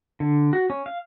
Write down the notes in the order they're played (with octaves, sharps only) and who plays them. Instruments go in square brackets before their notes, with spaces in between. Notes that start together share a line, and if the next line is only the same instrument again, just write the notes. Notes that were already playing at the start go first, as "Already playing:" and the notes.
[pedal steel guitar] D3
F#4
C#4
F5